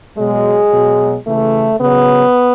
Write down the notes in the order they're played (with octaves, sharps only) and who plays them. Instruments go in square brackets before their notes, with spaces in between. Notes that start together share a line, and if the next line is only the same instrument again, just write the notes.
[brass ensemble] B2 F#3 G#3
B2 F#3
C#3 E3 A3
C#3 F#3 B3